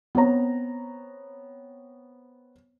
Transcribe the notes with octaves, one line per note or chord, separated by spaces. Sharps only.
B3 C4 C#5 A#5